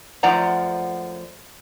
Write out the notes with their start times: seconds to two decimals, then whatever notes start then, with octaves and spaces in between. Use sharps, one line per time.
0.23 F#2 F3 A3 D5 F#5 A#5